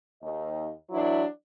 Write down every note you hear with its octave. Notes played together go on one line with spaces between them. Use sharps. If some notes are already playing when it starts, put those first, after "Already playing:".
D#2 D#5
E3 F#3 D4 E4